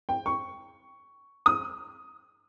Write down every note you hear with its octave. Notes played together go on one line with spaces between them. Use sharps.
G5
C#6
D#6